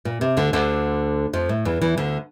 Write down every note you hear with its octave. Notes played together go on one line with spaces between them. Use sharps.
A#2
C3
D2 D3
D2 D3
F2 F3
A2
E2 E3
E2 E3
D2 D3